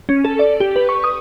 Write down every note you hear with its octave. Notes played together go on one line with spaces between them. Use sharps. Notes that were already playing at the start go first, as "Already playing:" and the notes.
C#4
A4
D5
G4
B4
C#6
D#6